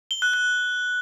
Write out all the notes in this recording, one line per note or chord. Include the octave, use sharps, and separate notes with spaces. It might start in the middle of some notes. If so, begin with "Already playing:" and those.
G7
F#6
F#6